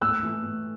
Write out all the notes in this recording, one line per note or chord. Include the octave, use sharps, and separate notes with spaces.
A2 E6 F#6
E3 A3
A2